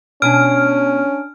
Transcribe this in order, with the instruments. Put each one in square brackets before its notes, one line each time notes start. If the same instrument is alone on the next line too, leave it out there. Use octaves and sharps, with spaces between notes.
[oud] B2 [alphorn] C#4 [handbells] D4 G#5 D7 [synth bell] F6